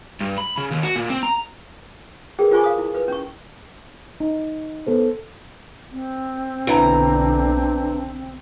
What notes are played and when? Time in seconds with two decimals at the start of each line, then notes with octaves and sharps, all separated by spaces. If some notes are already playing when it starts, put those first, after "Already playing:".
0.21 G2
0.38 B5
0.58 C#3
0.71 D#2
0.83 F#4
0.96 A#2
1.10 C4
1.23 A#5
2.39 G#4 A#4 B4 G5
2.51 F4 G#4 C5 G#5 C#6 D6
2.64 F5 D#6
2.78 E4
2.95 B4
3.08 C#4 C#6
4.20 D#4
4.87 B3 A4 C5
5.92 C4
6.67 B1 D3 E3 D4 A#5